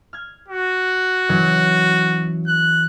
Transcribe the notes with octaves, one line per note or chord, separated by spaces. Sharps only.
F6 G#6
F#4
E3 F#3 C#4
F#6